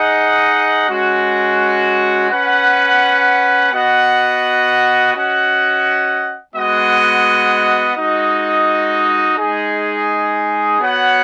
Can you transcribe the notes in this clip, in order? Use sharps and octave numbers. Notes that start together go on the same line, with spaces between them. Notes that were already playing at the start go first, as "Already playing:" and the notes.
Already playing: D#4 G#4 D#5 F#5
G#3 C#4 F#4
C#4 B4 F#5
B3 F#4 D#5 F#5
C#4 F#4 D#5 F#5
G#3 B3 F#4 D#5 F#5
G#3 D#4 F#4 D#5
G#3 D#4 G#4
B3 F#4 C#5 F#5